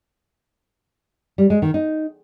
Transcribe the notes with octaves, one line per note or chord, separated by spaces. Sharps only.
G3
G#3
D#3
D#4